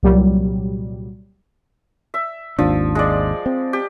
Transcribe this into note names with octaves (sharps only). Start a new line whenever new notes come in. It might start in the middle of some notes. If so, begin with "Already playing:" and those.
C2 A#2 F#3 G3
E5
G#1 D#2 F3 D4
G#3 D5
C4
G4